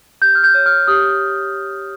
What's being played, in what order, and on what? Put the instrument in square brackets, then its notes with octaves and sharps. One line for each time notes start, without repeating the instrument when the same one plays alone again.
[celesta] G4 G6
F6
G6
C#5
F6
G4 D#6